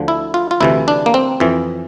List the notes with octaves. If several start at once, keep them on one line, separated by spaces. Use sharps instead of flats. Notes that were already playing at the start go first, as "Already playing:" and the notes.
Already playing: D2 D3 F3
E4
F4
F4
D2 C3 E3 E4
D4
A#3
C4
F2 E3